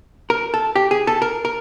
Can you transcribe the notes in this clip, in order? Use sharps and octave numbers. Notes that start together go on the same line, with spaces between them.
A#4
A4
G4
G#4
A4
A#4
A#4